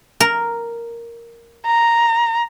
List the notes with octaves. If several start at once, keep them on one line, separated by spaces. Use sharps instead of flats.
A#4
A#5